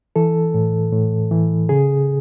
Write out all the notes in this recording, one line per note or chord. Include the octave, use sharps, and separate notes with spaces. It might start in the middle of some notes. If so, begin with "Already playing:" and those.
E3 A4
A2
A2
E3
C#3 G#4